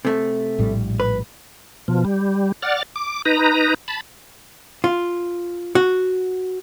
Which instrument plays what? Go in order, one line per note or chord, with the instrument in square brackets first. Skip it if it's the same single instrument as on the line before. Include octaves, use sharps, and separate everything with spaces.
[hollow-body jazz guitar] C3 A3
[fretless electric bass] A#1 A2 G3
[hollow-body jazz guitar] B4
[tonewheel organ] B2 F3
G3
D5 F#5 F6 A6
D6
D#4 B4 A#5
A5 B5
[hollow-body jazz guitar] F4
F#4